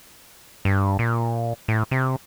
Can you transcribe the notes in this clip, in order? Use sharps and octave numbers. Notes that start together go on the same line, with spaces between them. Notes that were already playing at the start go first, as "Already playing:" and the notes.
G2
A#2
A2
C3